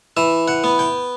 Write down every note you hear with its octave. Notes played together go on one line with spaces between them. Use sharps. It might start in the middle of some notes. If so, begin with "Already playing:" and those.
E3 E5
F#5
B3
G5